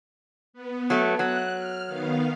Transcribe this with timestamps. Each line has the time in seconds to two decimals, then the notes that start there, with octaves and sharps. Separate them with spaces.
0.53 B3
0.90 F#3 A3
1.19 F#3 F#6
1.56 F6
1.87 D#3 B3 F5